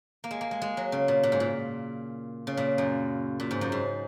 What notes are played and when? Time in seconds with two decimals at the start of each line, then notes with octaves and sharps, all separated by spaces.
0.24 A#3
0.31 G#3
0.41 A#3
0.51 G#3
0.62 G#3
0.77 F#3
0.92 C#3
1.08 A#2
1.23 A#2
1.32 G#2
1.40 A#2
2.47 C#3
2.57 A#2
2.78 F#2
3.40 A#2
3.51 G#2
3.61 F#2
3.72 G#2